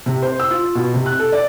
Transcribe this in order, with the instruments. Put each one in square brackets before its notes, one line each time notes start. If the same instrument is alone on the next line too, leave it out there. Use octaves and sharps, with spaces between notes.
[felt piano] C3
C5
E6
F4
B2
C3
F#6
A4
D5